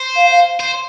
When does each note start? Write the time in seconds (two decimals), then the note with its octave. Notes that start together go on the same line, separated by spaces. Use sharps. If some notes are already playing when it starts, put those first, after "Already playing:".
Already playing: C5
0.16 F5
0.31 F5
0.60 C5